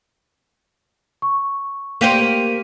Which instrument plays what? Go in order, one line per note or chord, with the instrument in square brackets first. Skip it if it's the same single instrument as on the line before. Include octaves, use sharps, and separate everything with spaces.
[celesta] C#6
[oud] A#3 G4 C5 [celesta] F5 B6 D#7